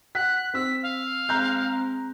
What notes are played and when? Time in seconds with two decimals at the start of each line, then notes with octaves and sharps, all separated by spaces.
0.15 F#5 F#6 B6
0.54 C4 E6 B6
0.83 F5
1.29 G#3 C4 A#5 F#6 G6